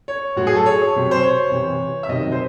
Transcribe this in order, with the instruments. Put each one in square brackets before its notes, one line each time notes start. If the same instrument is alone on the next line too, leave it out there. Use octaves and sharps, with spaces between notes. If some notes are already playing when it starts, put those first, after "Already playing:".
[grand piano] C#5
A2 F#3 F#4
G#4
A4
C#5
C3 F#3
C5
C#5
C3 E3
E5
C3 D#3 F#3 D#5
C5